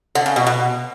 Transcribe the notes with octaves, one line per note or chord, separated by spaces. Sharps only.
D3
C#3
B2
B2